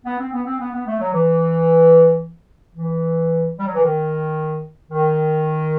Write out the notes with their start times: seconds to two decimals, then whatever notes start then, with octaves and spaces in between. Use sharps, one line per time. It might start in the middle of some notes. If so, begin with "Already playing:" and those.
0.06 B3
0.19 C4
0.32 B3
0.47 C4
0.59 B3
0.73 B3
0.87 A3
1.01 F#3
1.14 E3
2.75 E3
3.59 G3
3.67 F#3
3.75 E3
3.83 D#3
4.91 D#3